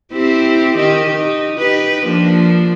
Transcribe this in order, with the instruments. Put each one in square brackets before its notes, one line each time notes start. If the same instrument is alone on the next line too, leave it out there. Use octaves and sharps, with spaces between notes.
[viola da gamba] C4 E4 G4
D#3 D#4 G4
D#4
D#4 G4 B4
F3 A#3 D4